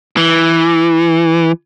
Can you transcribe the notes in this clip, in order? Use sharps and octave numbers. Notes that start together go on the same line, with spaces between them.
E3